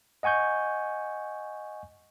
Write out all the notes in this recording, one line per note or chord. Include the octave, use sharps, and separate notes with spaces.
D#5 F#5 G#5 C#6 G6